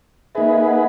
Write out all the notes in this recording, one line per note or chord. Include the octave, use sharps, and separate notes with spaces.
A#3 D#4 G#4 B4 E5
F5
F#5